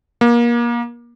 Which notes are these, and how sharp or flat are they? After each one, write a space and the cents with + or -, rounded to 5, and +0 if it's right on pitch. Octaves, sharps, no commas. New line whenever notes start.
A#3 +30